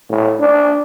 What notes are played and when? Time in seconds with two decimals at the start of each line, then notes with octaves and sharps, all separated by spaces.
0.10 A2
0.40 D4